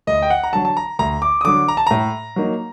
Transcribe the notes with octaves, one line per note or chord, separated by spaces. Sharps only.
D2 D#5
G5
F#5
A#5
D3 F#3 A5
A5
A#5
D2 A#5
D6
D#6
D3 F#3 D6
A#5
A5
A2 A#5
F#3 A#3 D#4